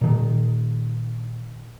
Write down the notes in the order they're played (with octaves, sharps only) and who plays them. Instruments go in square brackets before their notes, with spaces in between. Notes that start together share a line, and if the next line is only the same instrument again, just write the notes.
[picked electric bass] A#2 D#3